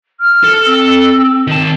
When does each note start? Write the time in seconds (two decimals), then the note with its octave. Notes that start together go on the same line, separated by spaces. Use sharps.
0.20 F6
0.44 A4
0.66 C4 E6
1.48 D#3 A5